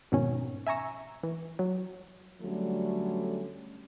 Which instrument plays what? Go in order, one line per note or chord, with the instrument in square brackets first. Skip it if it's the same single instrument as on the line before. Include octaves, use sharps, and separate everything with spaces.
[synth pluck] F2 G#2 B2 D#3 C#4
E5 G#5 A#5 C#6 E6
E3
F#3
[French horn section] D3 F#3 G3 A3 C#4